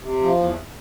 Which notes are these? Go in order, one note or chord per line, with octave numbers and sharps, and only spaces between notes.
C3
F3
E2